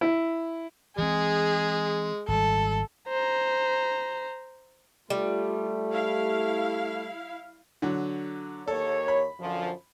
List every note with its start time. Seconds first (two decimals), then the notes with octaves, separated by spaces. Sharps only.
0.01 E4
0.98 E3 G#3 C4 G#4
2.28 G#1 G3 A4
3.09 C5 A#5
5.10 G3 A3 F4
5.90 E4 F5
7.82 D3 F#3
8.68 D#2 A#3 A4 C#5
9.08 B5
9.39 F#2 D3 F3